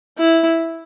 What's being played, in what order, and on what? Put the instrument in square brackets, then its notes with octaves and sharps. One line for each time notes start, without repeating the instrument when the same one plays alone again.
[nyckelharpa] E4